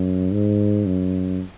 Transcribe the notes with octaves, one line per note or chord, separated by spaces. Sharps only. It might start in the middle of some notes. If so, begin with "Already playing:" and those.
Already playing: F#2
G#2
F#2